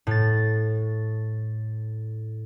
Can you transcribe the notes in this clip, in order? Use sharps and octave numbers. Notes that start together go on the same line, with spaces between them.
A2 A6